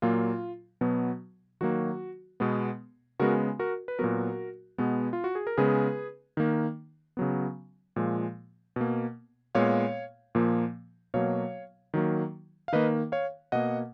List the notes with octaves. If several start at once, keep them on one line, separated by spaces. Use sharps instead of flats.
A#2 F#3 A#3 F4
B2 F#3 B3
D#3 F#3 A#3 F#4
B2 G#3 B3
C#3 G#3 B3 F#4 A#4
F#4 A#4
B4
A#2 F#3 B3 F#4 A#4
B2 G#3 B3
F4
F#4
G#4
A#4
C#3 G#3 B3 G#4 B4
D#3 A#3
C#3 F#3 B3
A#2 F3 G#3
B2 A#3
A#2 G#3 B3 C#5 F5
A#2 F3 A#3
B2 F#3 A#3 C#5 F5
D#3 F#3 A#3
F5
D#3 A#3 B4 D#5
C#5 F5
B2 A#3 D#5 F#5